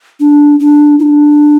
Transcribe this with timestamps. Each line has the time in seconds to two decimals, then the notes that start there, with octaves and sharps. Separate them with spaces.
0.20 D4
0.60 D4
0.99 E4
1.02 D4